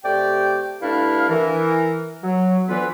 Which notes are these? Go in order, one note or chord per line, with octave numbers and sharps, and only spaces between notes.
C3 A3 G4 D5 G5
G2 A3 D4 E4 F5
E3 A#4
F#3
D2 D3 E3 B3 F4 B4